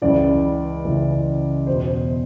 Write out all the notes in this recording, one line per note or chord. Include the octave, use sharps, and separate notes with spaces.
C#2 C#3 E3 D5
C#2 C#3 E3
E2 B2 C5